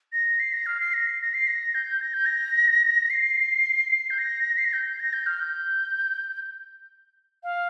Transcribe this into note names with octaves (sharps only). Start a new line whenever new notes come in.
A#6
C7
A#6
F6
C7
A#6
C7
A#6
C7
A#6
G6
A#6
G6
A#6
C7
G6
A#6
C7
A#6
G6
A#6
G6
F6
G6
F5